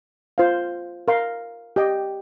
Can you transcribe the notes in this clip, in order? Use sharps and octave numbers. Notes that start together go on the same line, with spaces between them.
F4 C5 F5
A#4 F5 C6
G4 D#5 G5